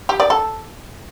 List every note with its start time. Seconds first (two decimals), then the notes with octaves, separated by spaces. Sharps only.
0.09 G4
0.20 D5
0.30 A4